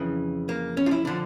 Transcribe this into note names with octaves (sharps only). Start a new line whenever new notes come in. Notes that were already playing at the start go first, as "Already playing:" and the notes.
Already playing: F2 C#3 E3
A#3
C#4
F4
E4
D3 F3 D4